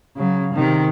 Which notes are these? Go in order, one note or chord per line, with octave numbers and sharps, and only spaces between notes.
C#3 F#3
C3 D#3